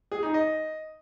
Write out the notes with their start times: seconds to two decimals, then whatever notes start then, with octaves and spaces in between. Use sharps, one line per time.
0.12 G#4
0.23 D#4
0.34 D#5